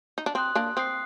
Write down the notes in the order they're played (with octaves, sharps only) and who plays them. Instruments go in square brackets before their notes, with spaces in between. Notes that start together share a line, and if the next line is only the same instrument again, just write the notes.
[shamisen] D#4
D4
[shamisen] C4 [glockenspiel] C6 D#6 F#6
[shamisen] A#3 D4
[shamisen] C4 [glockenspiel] D#6 F#6 C7